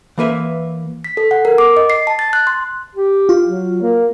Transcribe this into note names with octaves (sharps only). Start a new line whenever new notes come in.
E3 A#3 B4 E5
B6
A4
F#5
A#4
D6
D#5
C7
A5
A6
F#6
C6
G4
F4
F#3
A#3